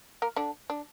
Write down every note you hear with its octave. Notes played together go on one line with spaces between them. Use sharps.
A#3 A#4
D3 D4
D4